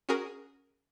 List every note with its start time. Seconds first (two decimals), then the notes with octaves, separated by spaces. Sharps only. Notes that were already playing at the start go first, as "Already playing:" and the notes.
0.09 C#4 F#4 G#4 A#4